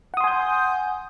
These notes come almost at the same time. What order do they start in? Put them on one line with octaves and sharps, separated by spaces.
F#5 D#6 C6 G#5 G6